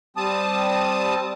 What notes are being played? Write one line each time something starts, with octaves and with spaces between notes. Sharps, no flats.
G3 C4 A5 D#6